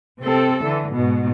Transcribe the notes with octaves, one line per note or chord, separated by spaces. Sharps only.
C3 C4 A4
D3 E3
G#2 B2